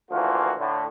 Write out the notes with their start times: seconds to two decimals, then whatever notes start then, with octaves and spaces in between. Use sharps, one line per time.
0.11 D2 E3 F3 A#3 F4 F#4
0.59 A2 D3